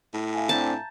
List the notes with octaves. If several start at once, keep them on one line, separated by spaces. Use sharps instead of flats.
A2
E5 F5 G#5
C4 D4 A5 A#5 G6 A6